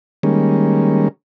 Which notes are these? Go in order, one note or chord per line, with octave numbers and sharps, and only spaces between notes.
D#3 G3 G#3 A#3 C#4